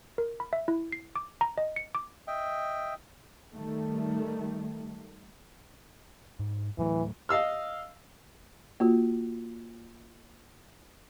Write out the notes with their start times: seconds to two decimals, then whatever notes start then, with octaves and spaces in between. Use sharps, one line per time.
0.18 A#4
0.40 B5
0.53 E5
0.68 E4
0.92 C7
1.16 D6
1.41 A#5
1.58 D#5
1.76 C#7
1.95 D6
2.27 D#5 E5 G5
3.54 D#3 G3 A3
6.39 G#2
6.78 A2 E3 F#3 A3
7.29 D#5 F5 E6 F6
8.80 A#3 F4 F#4